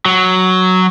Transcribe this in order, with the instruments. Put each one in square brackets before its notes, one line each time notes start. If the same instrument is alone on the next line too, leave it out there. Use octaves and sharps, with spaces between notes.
[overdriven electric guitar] F#3